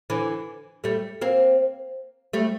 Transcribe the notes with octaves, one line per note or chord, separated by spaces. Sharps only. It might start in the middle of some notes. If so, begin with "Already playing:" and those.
D3 E3
G3 A3
A#3 C4
G3 A3